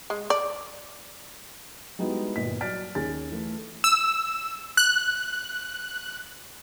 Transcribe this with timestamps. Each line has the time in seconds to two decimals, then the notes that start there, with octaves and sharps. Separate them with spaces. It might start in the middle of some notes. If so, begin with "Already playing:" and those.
0.10 G#3
0.30 D5
1.99 G3 G#3 B3 D#4 E4 F#4
2.36 G1 A#2 D#5 B6
2.61 F#3 D5 F6 A6 B6 D7
2.95 D#2 C#4 G#4 G#5 A6
3.32 E3 A3
3.84 E6
4.77 F#6